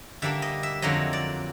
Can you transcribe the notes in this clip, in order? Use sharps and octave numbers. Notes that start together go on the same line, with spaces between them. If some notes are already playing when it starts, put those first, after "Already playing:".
D3 G3 A#3 D4 E5
D#5
E5
F2 D3 F#3 A#3 D#5
D5